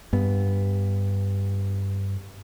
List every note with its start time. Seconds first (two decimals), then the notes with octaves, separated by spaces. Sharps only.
0.13 G2 B3